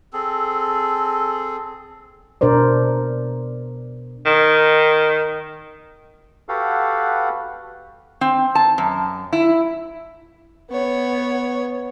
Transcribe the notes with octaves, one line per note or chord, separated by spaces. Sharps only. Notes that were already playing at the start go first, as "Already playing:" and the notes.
C4 G#4 A4
B2 D4 A#4 C5 D5
D#3
F#4 G4 A4 B4 F5 F#5
C4
A5
F#2
E4
B3 C#5